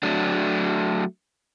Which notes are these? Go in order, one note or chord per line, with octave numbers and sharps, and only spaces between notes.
F#3 A3 D4